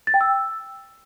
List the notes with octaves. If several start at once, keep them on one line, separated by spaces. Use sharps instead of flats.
A6
G5
E6